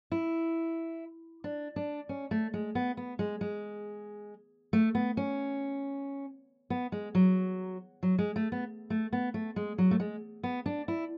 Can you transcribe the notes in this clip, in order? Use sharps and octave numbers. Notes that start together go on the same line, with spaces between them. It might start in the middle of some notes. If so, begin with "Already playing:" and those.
E4
D4
D4
C#4
A3
G#3
B3
B3
G#3
G#3
A3
B3
C#4
B3
G#3
F#3
F#3
G#3
A3
B3
A3
B3
A3
G#3
F#3
A3
G#3
B3
D4
E4